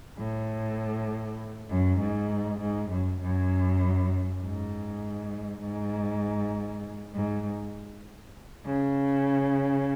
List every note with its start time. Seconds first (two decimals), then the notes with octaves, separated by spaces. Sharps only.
0.18 A2
1.69 F#2
2.00 G#2
2.60 G#2
2.91 F#2
3.21 F#2
4.42 G#2
5.62 G#2
7.14 G#2
8.65 C#3